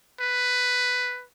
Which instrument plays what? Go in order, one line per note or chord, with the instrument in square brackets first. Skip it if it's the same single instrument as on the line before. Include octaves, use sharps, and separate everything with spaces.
[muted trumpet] B4